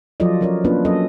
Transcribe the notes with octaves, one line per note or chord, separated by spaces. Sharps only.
F3 F#3 F4 A4 D5 D#5
F#3 C#4 A#4 C#5 D5
A#3 B3 C#4 D4 F4 B4
F#3 C#4 A4 D#5